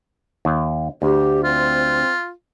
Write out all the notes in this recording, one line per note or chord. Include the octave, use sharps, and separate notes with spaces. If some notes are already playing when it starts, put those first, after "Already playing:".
D#2
D2 G4
C4 F4